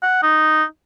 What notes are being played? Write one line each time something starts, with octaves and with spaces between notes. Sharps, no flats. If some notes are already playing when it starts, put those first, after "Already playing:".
F#5
D#4